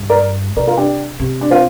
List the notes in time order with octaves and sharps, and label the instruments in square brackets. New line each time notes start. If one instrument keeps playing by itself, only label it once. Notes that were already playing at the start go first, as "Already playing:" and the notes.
Already playing: [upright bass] G2
[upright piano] A#4 D5
[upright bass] C3 [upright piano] A#4 D5
[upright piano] F4 A#4
D4 G4
[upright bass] C3
[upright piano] D4
C4 F4